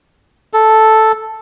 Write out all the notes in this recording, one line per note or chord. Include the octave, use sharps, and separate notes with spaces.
A4